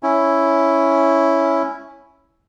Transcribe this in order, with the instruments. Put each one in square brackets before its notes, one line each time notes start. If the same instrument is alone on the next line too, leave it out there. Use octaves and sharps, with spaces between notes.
[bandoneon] C#4 E4